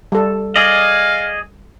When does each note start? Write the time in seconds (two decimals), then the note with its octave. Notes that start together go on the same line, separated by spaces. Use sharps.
0.12 G3 A4
0.56 G#4 D5 D#5 F5